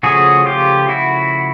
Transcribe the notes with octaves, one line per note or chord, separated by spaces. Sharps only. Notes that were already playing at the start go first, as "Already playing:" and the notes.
C#3 F3 A3 C#4 F#4 G#4
F4 G4
E4 F#4